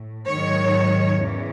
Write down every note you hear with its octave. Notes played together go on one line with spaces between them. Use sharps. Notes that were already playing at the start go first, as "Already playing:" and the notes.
Already playing: A2
G#2 D#3 F#3 C#5
E2 C#3 E3